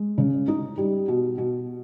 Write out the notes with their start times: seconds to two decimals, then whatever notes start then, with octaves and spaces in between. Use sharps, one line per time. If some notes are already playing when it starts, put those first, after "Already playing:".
Already playing: G#3
0.18 C#3
0.48 D#4
0.77 G3
1.08 B2
1.38 B2